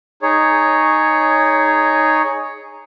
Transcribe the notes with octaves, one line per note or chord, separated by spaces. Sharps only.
D#4 G#4 C#5